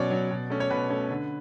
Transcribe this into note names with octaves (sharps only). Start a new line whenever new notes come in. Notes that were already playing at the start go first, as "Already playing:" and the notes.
Already playing: B2 F#3 C#4 C#5 D5
F#3 C#4
B2
A3 C#4
C#5
B2 B4
A3 C#4
D3